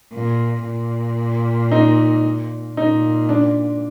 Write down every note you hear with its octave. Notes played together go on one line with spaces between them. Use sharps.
A#2
A#2
D#4
A#2 D#4
D4